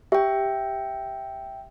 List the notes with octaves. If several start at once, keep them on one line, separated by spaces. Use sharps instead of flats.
G4 E5 G5